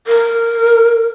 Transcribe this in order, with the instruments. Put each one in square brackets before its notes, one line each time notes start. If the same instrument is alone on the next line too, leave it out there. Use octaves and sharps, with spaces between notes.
[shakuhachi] A#4